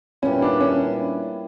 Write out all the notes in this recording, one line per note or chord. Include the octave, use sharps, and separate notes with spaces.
A#2 G3 B3 C#4 E4
D4
C#4